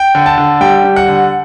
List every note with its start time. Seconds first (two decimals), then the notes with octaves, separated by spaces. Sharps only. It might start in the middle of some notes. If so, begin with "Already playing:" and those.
Already playing: G5
0.15 D3
0.26 A5
0.38 D3
0.61 G3 G5
0.84 G3
0.96 F#5
1.08 D3